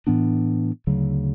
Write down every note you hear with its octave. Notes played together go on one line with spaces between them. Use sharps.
A2 E3 B3 D4
D2 C#3 F#3